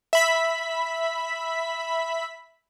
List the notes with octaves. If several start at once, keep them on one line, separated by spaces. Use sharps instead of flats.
E5 B5 B6